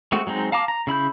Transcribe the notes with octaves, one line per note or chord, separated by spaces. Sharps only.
G#3 A3 C4 F#4
F#3 G#3 C4 D#4
F5 A5 A#5 D6
A#5
C#3 E4 B5 G6